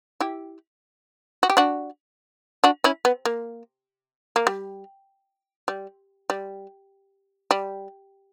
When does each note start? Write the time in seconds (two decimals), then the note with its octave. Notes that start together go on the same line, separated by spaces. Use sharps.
0.20 E4 G4
1.43 F#4
1.50 G4
1.57 D4 F#4
2.64 D4 F#4
2.84 C#4 E4
3.05 B3
3.25 A#3
4.36 A#3
4.47 G3
5.68 G3
6.30 G3
7.51 G3